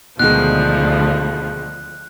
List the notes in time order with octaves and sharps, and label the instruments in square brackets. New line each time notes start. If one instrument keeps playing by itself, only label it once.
[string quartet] D2 F3 [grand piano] B2 D#3 G#3 [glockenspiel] F#6